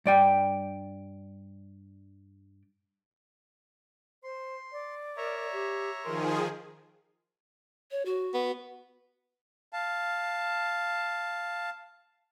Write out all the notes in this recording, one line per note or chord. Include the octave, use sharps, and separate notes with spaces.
G2 D5 G5
C5 C6
D5
A#4 C#5 E5 A#5
G4
D#3 F3 G#4 A#4 C6
C#5
F#4
B3
F5 A5